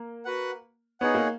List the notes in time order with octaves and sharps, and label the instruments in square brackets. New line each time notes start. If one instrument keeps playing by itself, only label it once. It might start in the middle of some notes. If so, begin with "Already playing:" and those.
Already playing: [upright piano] A#3
[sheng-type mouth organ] F#4 B4 F#5
[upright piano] B3 [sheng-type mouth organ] D#4 G#4 C#5 F#5
[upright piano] A#3